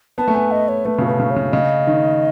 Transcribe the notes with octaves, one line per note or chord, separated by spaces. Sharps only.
B3 A5
A3
B3 G#5
D#5
C#5
A3 B4
C#3
B2
B4
C#3
C#5
C#3
C#3 D#5
D#3